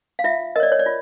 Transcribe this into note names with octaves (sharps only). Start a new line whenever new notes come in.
F5
F4 E5
A#4 C#5 D#5
D5
C#5
D5
F4